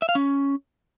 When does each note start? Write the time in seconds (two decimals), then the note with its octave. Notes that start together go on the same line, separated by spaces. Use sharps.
0.02 E5
0.09 F5
0.15 C#4